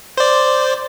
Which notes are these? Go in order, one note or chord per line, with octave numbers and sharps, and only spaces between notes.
C5 D5